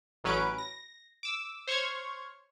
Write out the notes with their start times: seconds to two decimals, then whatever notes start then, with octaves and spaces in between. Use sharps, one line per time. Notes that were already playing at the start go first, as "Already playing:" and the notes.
0.24 A1 F#3 C#4 B4 D7
0.58 A#6
1.23 D6 E6
1.67 C5 C#5 C#6 F6 G#6